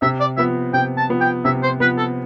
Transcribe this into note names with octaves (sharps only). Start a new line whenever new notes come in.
C3 E5
D5
F3 B3 E5
C3 G5
A5
F3 B3
G5
C3 E5
C5
F3 B3 B4
A4